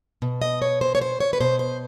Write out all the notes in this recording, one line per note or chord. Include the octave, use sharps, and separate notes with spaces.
B2
D#5
C#5
C5
C#5
C5
C#5
B4
B2 C5
C5